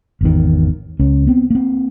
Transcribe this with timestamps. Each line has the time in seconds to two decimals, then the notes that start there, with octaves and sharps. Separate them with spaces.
0.21 G#1 E2 D#3
0.99 C#2 C#4
1.27 B3 C4
1.50 A#3 C4